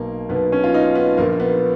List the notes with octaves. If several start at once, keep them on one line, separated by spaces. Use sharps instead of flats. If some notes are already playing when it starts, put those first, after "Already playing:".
Already playing: B1 B2 A#3
B1 B2 B3
C#4
F4
D#4
B3
A#1 A#2 A#3
B3